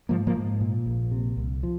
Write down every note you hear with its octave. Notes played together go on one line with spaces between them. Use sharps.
G#2 F3 A#3
F3 A#3
G#2
A#2
A#1
C3
C2
F3